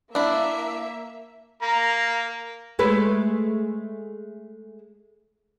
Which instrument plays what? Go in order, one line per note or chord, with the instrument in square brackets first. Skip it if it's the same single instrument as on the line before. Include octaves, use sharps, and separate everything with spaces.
[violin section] A#3 E5 [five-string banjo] D4 E4
[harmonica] A#3 [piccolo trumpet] A#5
[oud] G#3 A3 B4